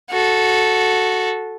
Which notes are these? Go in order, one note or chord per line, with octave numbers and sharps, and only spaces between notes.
F#4 A4